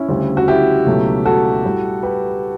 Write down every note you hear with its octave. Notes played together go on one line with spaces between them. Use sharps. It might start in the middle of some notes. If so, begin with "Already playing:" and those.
Already playing: C#4 E4
D2 C#3 G3
F#4
E4 G4
C#2 B2 F#3 A3
F#4 A4
A2 G3
G4 B4